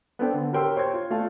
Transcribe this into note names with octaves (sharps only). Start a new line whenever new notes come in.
B3 C4 D4 A4 D5 G5
D3
G4 A#4 C#5 G5 C6 E6
C5 C#5 G5 C6 G#6
F4
A3 F4 D5 F5 A5